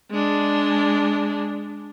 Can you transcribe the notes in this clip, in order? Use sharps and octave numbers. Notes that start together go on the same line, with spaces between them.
G#3 D4